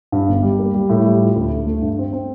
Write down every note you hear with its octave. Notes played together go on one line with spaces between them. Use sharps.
G2
G1
G3
A#3
G3
A2
G3
F4
D2
D2
A3
G2
C4
C4